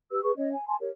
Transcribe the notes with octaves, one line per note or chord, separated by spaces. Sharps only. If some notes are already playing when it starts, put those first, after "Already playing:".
G4 B4 E6
G#4 B4 C#6
C#4 C#5 D#5
G#5
G#5 A5 C6
G4 A#4 C#5